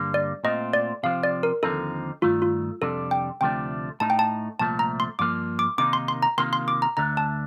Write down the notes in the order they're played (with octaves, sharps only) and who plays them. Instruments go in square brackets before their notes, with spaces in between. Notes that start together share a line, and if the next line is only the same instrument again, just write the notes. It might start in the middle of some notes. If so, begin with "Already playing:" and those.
Already playing: [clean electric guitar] G2 D3 G3 A#3
[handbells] D5
[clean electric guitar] A#2 A3 C4 F4 [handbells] D#5
[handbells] D5
[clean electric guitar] C3 F3 C4 [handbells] F5
[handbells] D5
A#4
[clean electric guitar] D#2 D3 F3 C4 D#4 [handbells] A4
[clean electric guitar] G2 D#3 A3 [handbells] F4
[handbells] F4
[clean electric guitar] F2 C3 G3 D4 [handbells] A4
[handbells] G5
[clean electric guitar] D2 C3 F3 A3 D4 [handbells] G5
[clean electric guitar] A2 A3 D#4 [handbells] A5
[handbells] G5
A5
[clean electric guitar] C2 A#2 F3 A3 [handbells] A5
[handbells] A#5
C6
[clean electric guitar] G2 F3 A#3 [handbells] D6
[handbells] D6
[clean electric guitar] C3 D#3 A#3 D#4 [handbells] D6
[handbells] C6
C6
A#5
[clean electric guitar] C3 D#3 A#3 F4 [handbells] C6
[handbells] C6
D6
A#5
[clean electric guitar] D2 D3 A3 [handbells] A#5
[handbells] A5